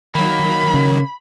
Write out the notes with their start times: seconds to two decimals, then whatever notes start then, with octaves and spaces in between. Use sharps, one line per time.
0.15 D#3 F#3 A#3 B5
0.74 C#3